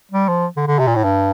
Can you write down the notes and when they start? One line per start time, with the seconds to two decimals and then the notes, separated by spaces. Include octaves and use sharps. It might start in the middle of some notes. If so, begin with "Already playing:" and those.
0.11 G3
0.28 F3
0.57 D3
0.67 D3
0.79 C3
0.87 A#2
0.96 A2
1.04 G2